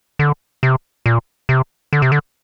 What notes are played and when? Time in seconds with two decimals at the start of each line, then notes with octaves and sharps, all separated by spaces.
0.19 D3
0.63 C3
1.06 A#2
1.49 C3
1.93 D3
2.02 C3
2.12 D3